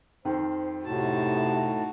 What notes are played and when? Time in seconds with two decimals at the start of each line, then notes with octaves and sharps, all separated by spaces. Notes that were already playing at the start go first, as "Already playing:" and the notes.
0.25 F2 D#3 C5
0.85 A2 C3 D#4 F#4 A5